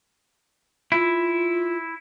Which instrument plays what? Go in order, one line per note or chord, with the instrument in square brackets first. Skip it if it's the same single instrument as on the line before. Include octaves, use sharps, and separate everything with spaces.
[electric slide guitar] E4 [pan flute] F4